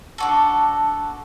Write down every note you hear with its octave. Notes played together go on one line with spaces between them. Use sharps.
D4 F#4 A4